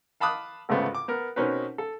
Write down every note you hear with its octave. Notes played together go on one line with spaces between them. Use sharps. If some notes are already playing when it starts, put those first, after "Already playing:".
F5 A5 B5 D6 D#6 F#6
G#1 C#2 C#3 A3 B3 C5
D6
B3 A#4
B2 C4 C#4 D#4 A#4 B4
A4